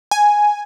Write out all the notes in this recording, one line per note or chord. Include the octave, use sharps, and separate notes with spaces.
G#5